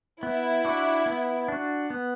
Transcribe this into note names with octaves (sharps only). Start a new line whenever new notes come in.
B3 E4
D4 F#4
B3
D4 F#4
B3